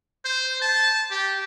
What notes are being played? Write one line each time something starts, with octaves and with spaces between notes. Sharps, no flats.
C5
A5
G4